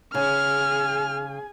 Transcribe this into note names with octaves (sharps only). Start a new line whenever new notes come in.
C#3 G#4 G#5 F6